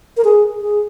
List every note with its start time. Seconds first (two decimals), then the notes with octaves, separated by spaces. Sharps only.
0.17 A#4
0.24 G#4
0.61 G#4